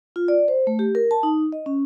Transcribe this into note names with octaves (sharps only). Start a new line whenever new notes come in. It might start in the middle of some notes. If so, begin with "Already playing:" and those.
F4
D5
C5
A3
G4
A#4
A5
D#4
D#5
C#4